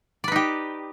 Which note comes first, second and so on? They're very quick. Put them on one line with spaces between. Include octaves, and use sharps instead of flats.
D5 B4 D#4 G4